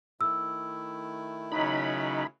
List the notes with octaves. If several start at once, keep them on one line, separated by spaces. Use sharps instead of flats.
D#3 A3 E4 E6
C#3 F#3 D#4 B5